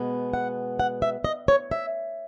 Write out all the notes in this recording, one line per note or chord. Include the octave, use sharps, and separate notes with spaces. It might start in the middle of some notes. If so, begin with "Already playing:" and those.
Already playing: B2 G#3 B3
F#5
F#5
E5
D#5
C#5
E5